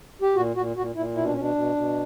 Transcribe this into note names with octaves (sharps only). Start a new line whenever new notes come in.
G4
A#2 F#4
A#2 F#4
A#2 F#4
A#2 E4
B2 E4
D4
C#4
B2
D4
B2
B2